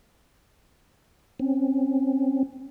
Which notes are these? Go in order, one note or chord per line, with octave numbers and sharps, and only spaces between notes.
C4 C#4